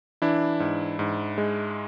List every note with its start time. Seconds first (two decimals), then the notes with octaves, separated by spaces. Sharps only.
0.22 E3 D4 E4
0.60 G#2
0.99 G#2
1.38 G#3